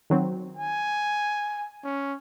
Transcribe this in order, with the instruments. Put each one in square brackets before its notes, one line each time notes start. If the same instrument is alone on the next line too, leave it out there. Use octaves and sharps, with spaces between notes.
[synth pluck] D#3 F#3 C4
[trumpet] G#5
C#4